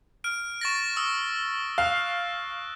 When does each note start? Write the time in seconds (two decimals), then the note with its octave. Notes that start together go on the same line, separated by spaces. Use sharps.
0.24 F6 D7
0.61 C#6 A6 A#6
0.96 D#6 E6
1.78 F5 F#6